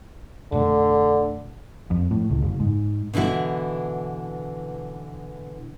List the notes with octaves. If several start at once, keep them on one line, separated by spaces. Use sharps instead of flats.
F2 B2 D3 A3
F2
A2
C#2
F#1
G#2
B2 D3 E3 E4 F#4